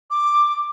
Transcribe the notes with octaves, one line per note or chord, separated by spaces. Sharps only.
D6